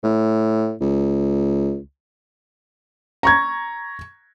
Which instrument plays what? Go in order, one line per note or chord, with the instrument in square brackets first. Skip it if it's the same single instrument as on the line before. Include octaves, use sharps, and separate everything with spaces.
[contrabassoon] A2
C#2
[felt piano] A#5 C#6 G#6